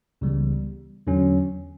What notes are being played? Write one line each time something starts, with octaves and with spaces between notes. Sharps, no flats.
C#2 C#3 E3 G3 B3
E2 D3 F#3 C#4